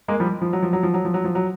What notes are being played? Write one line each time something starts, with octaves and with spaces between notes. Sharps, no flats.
G#3 A#3
F3 G3
F3
F#3
F3
F#3
F3
F#3
F3
F#3
F3
F#3